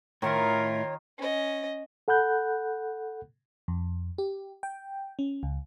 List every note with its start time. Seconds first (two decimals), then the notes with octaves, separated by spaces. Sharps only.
0.22 A2 D#3 E4 F4 A#4 C#5
1.18 C#4 D#5
2.08 A4 F#5 B5 F#6 G6
3.68 F2
4.18 G4
4.63 G5
5.19 C#4
5.43 C#2